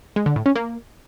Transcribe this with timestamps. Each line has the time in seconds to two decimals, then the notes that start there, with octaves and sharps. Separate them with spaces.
0.16 G#3
0.26 D3
0.36 A2
0.46 C#4
0.56 A#3